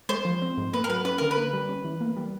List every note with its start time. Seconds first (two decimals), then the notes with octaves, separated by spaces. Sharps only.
0.09 G#3 C5
0.25 F3
0.42 C4
0.58 G#2
0.73 A#3 B4
0.84 A#4
0.89 F#3 B4
1.05 C#4 B4
1.18 D3 A#4
1.31 B4
1.37 A#3
1.53 G3
1.69 C#4
1.85 E3
2.01 A#3
2.17 G3